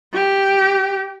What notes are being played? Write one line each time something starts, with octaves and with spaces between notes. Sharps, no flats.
G4